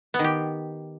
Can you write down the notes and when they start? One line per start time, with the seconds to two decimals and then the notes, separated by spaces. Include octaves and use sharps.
0.14 B3
0.19 D#3
0.24 G4